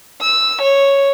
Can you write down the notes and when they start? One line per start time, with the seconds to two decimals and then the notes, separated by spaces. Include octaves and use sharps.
0.22 E6
0.63 C#5